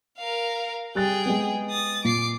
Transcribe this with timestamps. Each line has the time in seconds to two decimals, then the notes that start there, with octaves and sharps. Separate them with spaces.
0.17 A#4 F5
0.95 G3 G#4 G5 F#6 A6
1.26 G#3 B3
1.70 D#6 A6
2.05 A#2 D6 C7